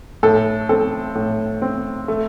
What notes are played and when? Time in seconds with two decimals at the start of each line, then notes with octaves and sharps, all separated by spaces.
0.23 A2 A4
0.69 C4 A4
1.15 A2
1.62 C4
2.08 A3